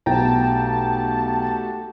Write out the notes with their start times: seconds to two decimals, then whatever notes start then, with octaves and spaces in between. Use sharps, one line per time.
0.06 B1 A3 F#4 G4 G5 A5 A#5